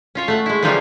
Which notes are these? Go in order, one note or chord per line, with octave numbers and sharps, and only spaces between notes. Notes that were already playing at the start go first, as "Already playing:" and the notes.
C#4 F4 C#5
A3 F#5
G#3 E4
C#3 E3 F3 G3 D#4 F4